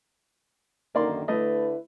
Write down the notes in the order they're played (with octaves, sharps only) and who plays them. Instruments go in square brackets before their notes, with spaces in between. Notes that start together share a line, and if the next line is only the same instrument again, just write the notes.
[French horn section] F#2 D3 D#3 [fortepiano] A#3 D5 C6
[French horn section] D3 E4 B4 [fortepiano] A3 D#5